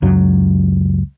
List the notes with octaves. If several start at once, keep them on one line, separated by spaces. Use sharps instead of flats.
C#2 F#2 F#3